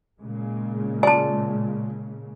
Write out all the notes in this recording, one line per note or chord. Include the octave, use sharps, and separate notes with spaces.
A#2 C#3 G#3
F4 D5 G#5 A5